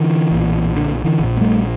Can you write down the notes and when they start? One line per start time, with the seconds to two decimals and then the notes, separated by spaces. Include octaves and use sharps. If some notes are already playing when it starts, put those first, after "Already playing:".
Already playing: D3 E3
0.31 B1 A#2
0.76 D3
1.04 D3 E3
1.19 A#1 A#2
1.37 A#3
1.41 G3 A3